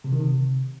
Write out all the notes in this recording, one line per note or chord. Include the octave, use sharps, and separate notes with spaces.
C3
D#3
C3